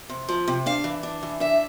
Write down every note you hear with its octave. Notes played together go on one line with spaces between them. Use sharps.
C3
F3
C3
D4 F5
E3
D4
E3
D4 E5